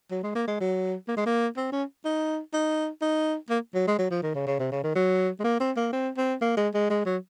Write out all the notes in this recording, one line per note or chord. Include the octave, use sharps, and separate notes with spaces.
F#3
G#3
A#3
G#3
F#3
A#3
G#3
A#3
C4
C#4
D#4
D#4
D#4
A#3
F#3
G#3
F#3
F3
D#3
C#3
C#3
C3
C#3
D#3
F#3
G#3
A#3
C4
A#3
C4
C4
A#3
G#3
G#3
G#3
F#3